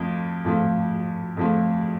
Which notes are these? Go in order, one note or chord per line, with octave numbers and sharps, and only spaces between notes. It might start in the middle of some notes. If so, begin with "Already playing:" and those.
Already playing: F2 F3 A3
F2 F3 A3
F2 F3 A3